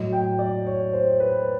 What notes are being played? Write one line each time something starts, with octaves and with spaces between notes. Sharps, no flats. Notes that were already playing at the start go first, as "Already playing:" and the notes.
Already playing: A2 F#3 D#5
G5
D5
C#5
C5
B4